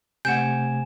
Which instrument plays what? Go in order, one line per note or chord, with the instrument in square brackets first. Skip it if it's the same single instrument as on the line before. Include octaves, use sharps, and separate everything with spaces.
[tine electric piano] C3 A3 G#6 [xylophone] F#5 G6 [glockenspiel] G#5 E7